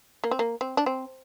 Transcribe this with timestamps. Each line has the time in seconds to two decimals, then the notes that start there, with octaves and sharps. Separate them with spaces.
0.24 A#3
0.31 C4
0.39 A#3
0.61 C4
0.77 D4
0.86 C4